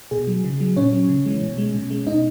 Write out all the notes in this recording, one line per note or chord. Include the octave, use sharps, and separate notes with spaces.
B2 G#4
F#3
C#3
F#3
A#2 C#4 C#5
F#3
C#3
E3 G#3
B2
G#3
B2
G#3
B2 D#4 D#5